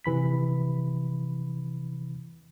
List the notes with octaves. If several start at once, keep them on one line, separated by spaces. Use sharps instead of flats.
C3 E3 B5 B6